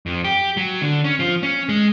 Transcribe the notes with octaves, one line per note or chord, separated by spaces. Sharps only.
F2
G4
F#3
D3
C#4
F3
C#4
G#3